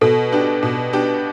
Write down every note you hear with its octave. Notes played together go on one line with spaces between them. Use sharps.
B2 A4
B3 D4 G4
B2
B3 D4 G4